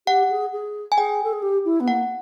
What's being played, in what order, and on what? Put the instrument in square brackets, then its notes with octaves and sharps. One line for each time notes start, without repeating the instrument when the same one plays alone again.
[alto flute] G4 [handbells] F#5
[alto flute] G#4
G#4
[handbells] G#5
[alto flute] G#4 [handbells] G5
[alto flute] A4
G#4
G4
E4
B3
[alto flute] A#3 [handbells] F#5